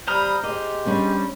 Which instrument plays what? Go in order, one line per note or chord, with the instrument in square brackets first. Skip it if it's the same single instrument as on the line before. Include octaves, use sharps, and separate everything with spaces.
[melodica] G3 B5 D#6 [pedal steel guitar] C5 A#5 F6
[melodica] G#3 G4 [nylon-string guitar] D#5
[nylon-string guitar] G3 C#4 D4